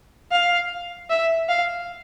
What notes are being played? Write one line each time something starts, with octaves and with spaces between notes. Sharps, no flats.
F5
E5
F5